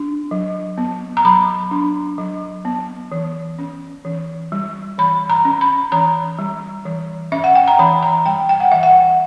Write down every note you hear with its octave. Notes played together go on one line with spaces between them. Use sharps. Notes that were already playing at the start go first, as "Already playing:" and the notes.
Already playing: D4
F#3
B3
A#5
F#3 B5
D4
F#3
B3
E3
C#4
E3
G3
E3 B5
A#5
C#4
B5
E3 A#5
G3
E3
C#4 E5
F#5
G5
A#5
E3 B5
A#5
G3 G5
G5
F#5
E3 E5
F#5